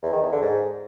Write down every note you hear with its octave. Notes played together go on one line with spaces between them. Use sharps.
E2
D#3
E2
D3
G#2